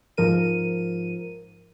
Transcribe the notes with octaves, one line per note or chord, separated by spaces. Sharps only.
G#2 F3 A#4 D#7